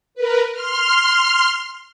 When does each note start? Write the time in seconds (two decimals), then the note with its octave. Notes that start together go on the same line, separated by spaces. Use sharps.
0.15 A#4 B4
0.52 C6 F6